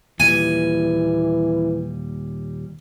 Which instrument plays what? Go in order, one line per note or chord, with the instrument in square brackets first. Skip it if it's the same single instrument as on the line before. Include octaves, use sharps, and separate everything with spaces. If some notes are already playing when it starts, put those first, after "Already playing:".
[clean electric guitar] D#2 A#2 G3 [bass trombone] E3 [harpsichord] G#5